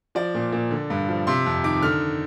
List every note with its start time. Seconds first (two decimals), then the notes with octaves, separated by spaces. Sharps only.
0.15 F3 D5
0.34 A#2
0.52 A#2
0.71 D3
0.90 G2
1.09 F3
1.27 C3 C6
1.46 F2
1.64 D#3 D6
1.82 D3 F6